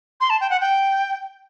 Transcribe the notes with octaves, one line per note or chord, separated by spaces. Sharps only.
C6
A5
G5
F#5
G5